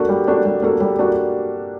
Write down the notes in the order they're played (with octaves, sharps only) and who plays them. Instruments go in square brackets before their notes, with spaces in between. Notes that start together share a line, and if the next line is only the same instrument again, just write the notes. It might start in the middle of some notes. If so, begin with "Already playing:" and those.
Already playing: [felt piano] A#3 D4 F#4 A4
G3
A#3 D4 F#4 A4
G3
A#3 D4 F#4 A4
G3
A#3 D4 F#4 A4